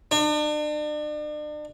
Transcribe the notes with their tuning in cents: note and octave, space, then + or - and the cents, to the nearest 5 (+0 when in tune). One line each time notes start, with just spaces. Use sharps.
D4 +40